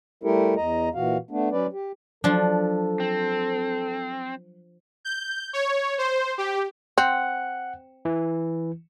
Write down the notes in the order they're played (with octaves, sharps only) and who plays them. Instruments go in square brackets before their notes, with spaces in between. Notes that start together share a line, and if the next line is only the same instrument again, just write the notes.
[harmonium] G3 A3 E4 G4 A4 A#4
E2 D#5 A#5
A#2 E3 F#4 F5
A3 B3 D4
F#3 C#4 B4 D5
G4
[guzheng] F3 D4 [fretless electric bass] F#3 [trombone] A4
[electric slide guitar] C4
[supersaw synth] G6
C#5
C5
G4
[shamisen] C4 [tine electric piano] F#5 F#6
[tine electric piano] E3